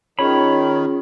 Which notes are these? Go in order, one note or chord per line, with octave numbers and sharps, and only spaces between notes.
D#3 C#4 F4 G#4 C#5 B5